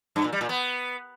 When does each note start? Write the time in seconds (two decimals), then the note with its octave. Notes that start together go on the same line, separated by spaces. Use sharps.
0.16 G2
0.24 A#2
0.32 G3
0.41 A#2
0.49 B3